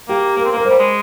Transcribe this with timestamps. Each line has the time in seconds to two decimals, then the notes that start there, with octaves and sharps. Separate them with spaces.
0.08 A#3 G4
0.37 A#3 A#4
0.45 C4
0.52 A#3 A#4
0.65 C5
0.70 G3
0.79 G#3